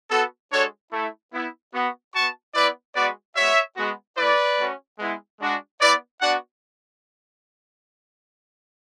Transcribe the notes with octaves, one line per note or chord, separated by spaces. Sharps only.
B3 F#4 A4
G#3 D4 F#4 A4 C#5
A3 E4
B3 E4
B3 F#4
B3 F#4 A5 C#6
B3 E4 B4 D5
G#3 B3 F#4 B4 D5
G#3 B3 F#4 C#5 E5
G#3 B3 F#4
A3 E4 B4 D5
A3 C#4 F#4
G#3 B3 E4
G#3 D4 F#4
B3 E4 B4 D5
B3 D4 F#4 D5 F#5